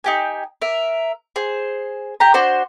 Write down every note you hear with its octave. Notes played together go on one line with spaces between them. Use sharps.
D#4 G4 G#5
A#4 E5
G#4 C5
G4 A#5
D4 F#4 C5